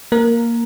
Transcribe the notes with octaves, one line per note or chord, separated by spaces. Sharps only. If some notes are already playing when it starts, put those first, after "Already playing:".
A#3 A#4